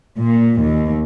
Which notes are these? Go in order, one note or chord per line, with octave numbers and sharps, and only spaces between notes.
A#2
D#2